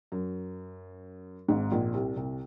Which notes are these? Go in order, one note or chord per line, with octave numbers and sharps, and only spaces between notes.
F#2
G#1 G#2
A#1 A#2
C2 C3
C2 C3